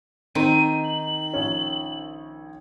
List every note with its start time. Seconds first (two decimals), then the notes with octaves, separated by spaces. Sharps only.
0.35 D#3 C4 D#7
0.84 F#7
1.33 A#1 C#4